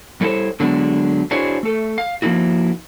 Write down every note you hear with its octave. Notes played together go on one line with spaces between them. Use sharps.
G3 A3 E4 A4 C5 C#5
D3 F#3 G#3 B3 D4
D4 E4 F#4 G#4 C5 C#5
A3 A4
F5
F3 A#3 D#4 E4 F#4